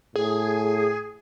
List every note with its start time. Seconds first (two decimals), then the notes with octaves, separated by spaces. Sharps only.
0.16 A2 G#4